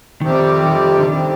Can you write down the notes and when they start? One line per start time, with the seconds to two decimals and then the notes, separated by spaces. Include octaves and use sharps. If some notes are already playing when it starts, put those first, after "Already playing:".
0.21 F2 C3 D#3 G3 C4 G4
0.65 D#3
0.98 D3
1.09 F2 C3 D#3 G3 C4 G4